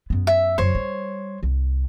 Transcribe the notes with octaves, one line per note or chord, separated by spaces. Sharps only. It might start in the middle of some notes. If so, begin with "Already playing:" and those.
F#2 B3
E5
F#2 C#3 C5 C#5
G3
C2